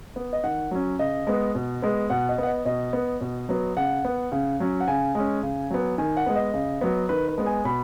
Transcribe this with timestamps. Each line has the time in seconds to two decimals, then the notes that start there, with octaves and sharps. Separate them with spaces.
0.16 B3
0.33 D#5
0.44 D#3 F#5
0.71 F#3 C#4
0.99 C#3 D#5
1.27 G#3 B3
1.55 B2
1.82 G#3 B3
2.10 B2 F#5
2.29 D#5
2.38 B3 F#5
2.47 D#5
2.65 B2 D#5
2.93 B3
3.21 B2
3.49 F#3 B3
3.77 C#3 F#5
4.05 B3
4.32 C#3
4.60 F#3 C#4
4.80 F#5
4.88 C#3 G#5
5.15 G#3 C#4
5.43 C#3
5.70 F#3 B3
5.98 D#3 G#5
6.17 F#5
6.26 G#3 B3
6.35 D#5
6.54 C#3
6.81 F#3 B3
7.09 D#3 B4
7.28 B4
7.38 G#3 B3
7.46 G#5
7.65 B2 B5